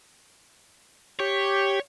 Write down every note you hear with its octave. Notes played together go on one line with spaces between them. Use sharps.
G4 C#5